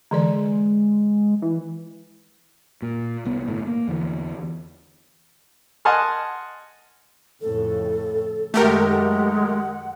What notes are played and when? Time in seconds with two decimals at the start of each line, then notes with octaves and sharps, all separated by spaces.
0.11 D3 E3 G#3 D5
1.42 E3
2.82 A#2
3.25 C2 B3
3.48 G1 A2
3.67 A#3
3.88 E2 D3 E3
5.85 D#5 F#5 G#5 A5 C6 F6
7.41 F2 A2 C#3 A4
8.54 F#2 D#3 G#3 A3 G4 A#4 F#5